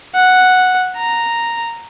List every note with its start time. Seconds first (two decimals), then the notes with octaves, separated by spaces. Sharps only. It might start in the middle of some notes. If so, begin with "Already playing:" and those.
0.15 F#5
0.97 A#5